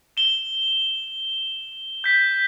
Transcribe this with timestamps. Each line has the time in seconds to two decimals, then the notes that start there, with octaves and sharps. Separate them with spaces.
0.17 E7 G7
2.04 G6 B6